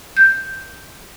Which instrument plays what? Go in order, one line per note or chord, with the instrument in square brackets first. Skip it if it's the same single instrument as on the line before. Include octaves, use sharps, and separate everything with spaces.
[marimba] G6